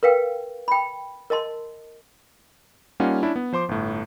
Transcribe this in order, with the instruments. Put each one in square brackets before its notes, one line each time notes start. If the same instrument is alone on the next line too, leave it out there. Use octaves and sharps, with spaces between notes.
[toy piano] A#4 B4 F5 G5
G5 B5
A#4 D#5 A5 C6
[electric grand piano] G3 A#3 C#4 D#4 F4 F#5
C#4 D4 E4
B3
F3 C5 C6 D6
G1 A2